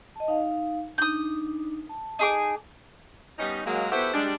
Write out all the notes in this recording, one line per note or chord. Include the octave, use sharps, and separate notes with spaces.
D#5 A5
D#4 F5
D4 D#4 D#6 G6
A5
D#4 G#4 D6
G3 B3 C#4 D#4
F#3 G#3 A#3
B3 E4 F#4 G4 A4 C5
G3 G#3 D4